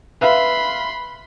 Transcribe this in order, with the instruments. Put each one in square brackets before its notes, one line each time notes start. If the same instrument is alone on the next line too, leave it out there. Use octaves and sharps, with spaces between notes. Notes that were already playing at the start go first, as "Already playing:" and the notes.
[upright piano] B4 E5 F5 [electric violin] B5 C6